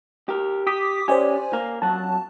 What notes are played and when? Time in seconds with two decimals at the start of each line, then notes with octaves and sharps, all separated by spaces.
0.29 G4 A#4
0.67 G4 D6 D#6 B6
1.08 C#4 G4 C5 D5 G#5
1.53 A#3 A#4
1.82 F2 F#3 F#5 A5